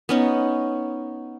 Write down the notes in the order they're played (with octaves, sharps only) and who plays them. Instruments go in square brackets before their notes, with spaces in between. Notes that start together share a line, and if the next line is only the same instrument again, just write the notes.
[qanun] B3 C#4 D#4